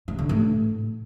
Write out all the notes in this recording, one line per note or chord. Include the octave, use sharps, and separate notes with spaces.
C#3
D3
A2